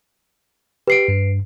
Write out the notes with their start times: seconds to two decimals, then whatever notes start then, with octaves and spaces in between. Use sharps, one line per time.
0.87 G4 B4 C7 D7
1.08 G2